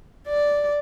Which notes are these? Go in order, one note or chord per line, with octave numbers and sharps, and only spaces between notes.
D5